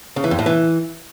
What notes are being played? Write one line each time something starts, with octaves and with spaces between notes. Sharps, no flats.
C#3
E3
F2
A2
E3